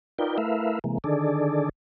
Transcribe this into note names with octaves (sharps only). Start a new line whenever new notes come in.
D#4 F4 A#4 B4 D5 G5
A3 E4 A#4 B4 E5 F5
C3 E3 G#3 A#3
D3 D#3 D4 G#4 A4 D5